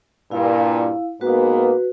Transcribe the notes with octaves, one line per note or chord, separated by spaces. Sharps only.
G2 A#2 E4 F5
G#2 A#3 B3 F#4 B4